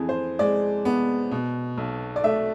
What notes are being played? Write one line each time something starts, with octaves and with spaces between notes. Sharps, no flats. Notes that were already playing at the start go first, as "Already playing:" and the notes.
Already playing: F2 E3 G#4
C5
G#3 D5
B3
B2
B1
D5
A3 E5